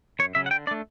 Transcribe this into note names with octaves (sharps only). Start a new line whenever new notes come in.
F#2 C#5
C#3 F#3 C#4 E5
F#5
D3 G5
A3 D4 D5